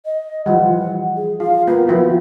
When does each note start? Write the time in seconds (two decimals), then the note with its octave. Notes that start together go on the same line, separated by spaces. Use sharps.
0.06 D#5
0.46 E3 F3 G3 F#5
1.17 G#4
1.40 F4 F5
1.68 A#3 B3 F4
1.88 F3 B3 E4 F#4